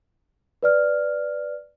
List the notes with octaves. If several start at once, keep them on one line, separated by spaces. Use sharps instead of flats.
B4 D5 F6